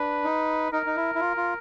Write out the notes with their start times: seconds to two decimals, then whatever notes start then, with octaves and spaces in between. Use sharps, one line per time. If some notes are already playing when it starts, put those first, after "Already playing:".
Already playing: D4 B4
0.24 D#4
0.72 D#4 A#4
0.86 D#4
0.96 E4
1.15 E4
1.21 F4
1.37 F4